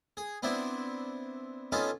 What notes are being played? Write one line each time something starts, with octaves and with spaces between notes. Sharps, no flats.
G#4
B3 C4 D4 E4
B3 C#4 D#4 F4 A4